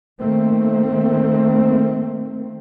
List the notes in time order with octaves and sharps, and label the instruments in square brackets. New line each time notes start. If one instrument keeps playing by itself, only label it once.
[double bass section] D#3 A3 A#3 C4